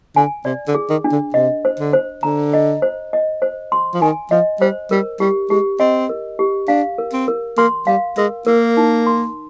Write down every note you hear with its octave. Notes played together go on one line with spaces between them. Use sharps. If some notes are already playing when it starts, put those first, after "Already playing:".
D3 G#5
C3 D5
D3
G#4
D#3
D4
D3
C3 D#5
C5
D3
C5
D3 A#5
D#5
C5
D#5
C5
C6
F3
D#3 G#5
F3 D#5
G3 C5
G3 A#4
G3 G4
G#3 G4
C4 D#5
A#4
G4
D4 F5
A#4
C4
A#4
A#3 C6
G3 F5
G#3 A#4
A#3 A#4
D#4
C6